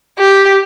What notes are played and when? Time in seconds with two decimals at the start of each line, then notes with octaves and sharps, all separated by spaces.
0.19 G4